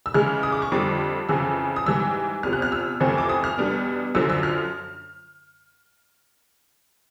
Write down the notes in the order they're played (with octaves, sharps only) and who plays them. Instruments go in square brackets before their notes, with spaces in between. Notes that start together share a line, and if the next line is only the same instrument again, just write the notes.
[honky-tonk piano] E6
C#3 E3 G#3 F6
D#6
D6
C#6
F2 D3 G3 D6
F2 C#3 E3 E6
D#6
G#2 E3 G3 E6
E2 C3 F3 F6
F#6
F6
E6
F2 C3 E3 A3 C4
D6
D#6
F6
E2 B2 G3 B3 D4
F#2 D3 F3 E6
E6
F6